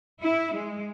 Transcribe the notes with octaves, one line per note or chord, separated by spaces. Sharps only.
E4
G#3